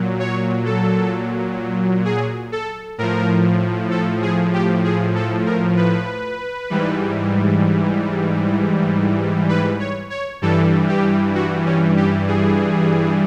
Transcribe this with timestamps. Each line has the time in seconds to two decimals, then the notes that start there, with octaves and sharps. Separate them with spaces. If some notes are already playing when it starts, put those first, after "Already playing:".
Already playing: A#2 F#3
0.19 C#5
0.65 A4
2.05 G#4
2.52 A4
2.98 A2 F3 A#4
3.91 A4
4.22 G#4
4.53 G4
4.84 G#4
5.15 A4
5.46 A#4
5.77 B4
6.70 G#2 E3 G3
9.49 B4
9.80 C#5
10.10 C#5
10.42 G2 E3 G3 A4
10.88 G4
11.35 F#4
11.66 C#4
11.97 G4
12.27 G#4